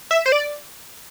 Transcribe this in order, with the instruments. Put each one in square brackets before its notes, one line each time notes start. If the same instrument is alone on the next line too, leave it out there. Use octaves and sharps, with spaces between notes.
[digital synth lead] E5
C5
D5